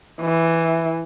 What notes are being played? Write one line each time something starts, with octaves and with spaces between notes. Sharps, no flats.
E3